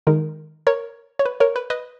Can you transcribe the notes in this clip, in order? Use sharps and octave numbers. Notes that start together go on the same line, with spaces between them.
D#3 G#3 D#4 A#4
A#4 C#5
C#5
B4
A#4 C#5
B4
B4 D#5